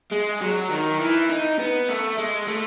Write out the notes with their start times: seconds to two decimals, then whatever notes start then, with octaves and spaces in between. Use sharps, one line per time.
0.11 G#3
0.41 F#3
0.70 D#3
1.00 E3
1.30 D#4
1.59 B3
1.89 A3
2.18 G#3
2.48 A3